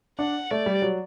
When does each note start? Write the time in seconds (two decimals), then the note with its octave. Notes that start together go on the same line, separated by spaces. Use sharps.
0.19 D4 F#5
0.51 A3 D5
0.66 G3
0.82 F#3